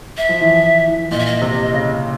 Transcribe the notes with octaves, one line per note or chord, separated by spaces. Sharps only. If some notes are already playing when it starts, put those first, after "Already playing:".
E5
F3
E3
E3
A#2 D#5
E5
D#5
C3
C#3